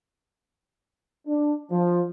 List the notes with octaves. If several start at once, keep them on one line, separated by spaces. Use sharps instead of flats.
D4
F3